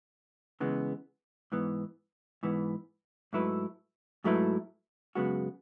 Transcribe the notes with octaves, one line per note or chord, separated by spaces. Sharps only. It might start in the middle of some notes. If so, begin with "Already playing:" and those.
C#3 E3 G#3 B3
G#2 E3 B3
G#2 E3 B3
G#2 F#3 A3 E4 B4
G#2 F#3 A3 E4 B4
F#2 C#3 G#3 B3 F#4